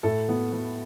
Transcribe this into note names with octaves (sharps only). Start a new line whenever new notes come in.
A2 A4
B3
B3